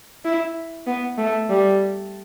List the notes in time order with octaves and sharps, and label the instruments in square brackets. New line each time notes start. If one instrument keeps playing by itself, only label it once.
[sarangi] E4
B3
A3
G3